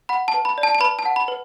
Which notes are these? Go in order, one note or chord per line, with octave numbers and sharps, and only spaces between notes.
F#5 B5
A5
B4
B5
D5
A5
A5
B4 B5
A5
F#5
B5
B4